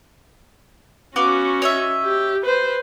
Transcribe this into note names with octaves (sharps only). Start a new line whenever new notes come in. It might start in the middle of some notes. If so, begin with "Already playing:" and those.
B3 C#4 F#4 F5 D6
C#5 D#5 E5
G4
B4 C5